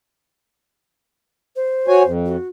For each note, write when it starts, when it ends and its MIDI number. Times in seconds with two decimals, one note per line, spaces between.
1.56 2.11 72
1.88 2.03 66
1.88 2.03 73
1.88 2.03 80
2.04 2.36 41
2.25 2.47 66